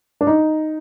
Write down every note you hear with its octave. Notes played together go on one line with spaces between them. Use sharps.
D4
D#4